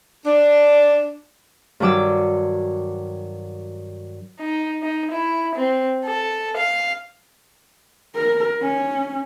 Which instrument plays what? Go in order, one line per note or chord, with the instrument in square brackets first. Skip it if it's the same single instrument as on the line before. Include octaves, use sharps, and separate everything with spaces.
[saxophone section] D4
[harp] G2 D#3 F#3 D6 E6
[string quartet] D#4
D#4
E4
C4
A4
F5
[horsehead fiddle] A#4
C#4